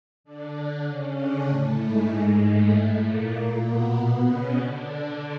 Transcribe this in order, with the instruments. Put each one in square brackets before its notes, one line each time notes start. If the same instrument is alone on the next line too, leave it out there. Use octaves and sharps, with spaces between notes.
[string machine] D3 D4
C#3 C#4
D3 D4
A2 A3
G#2 G#3
A2 A3
A#2 A#3
B2 B3
B2 B3
C#3 C#4
D3 D4